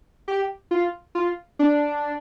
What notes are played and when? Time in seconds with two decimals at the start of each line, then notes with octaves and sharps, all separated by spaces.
0.28 G4
0.71 F4
1.15 F4
1.59 D4